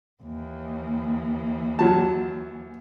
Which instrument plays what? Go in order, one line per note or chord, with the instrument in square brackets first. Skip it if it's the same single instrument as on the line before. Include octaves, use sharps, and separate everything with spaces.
[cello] D#2 E3
[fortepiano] F#2 F#3 A5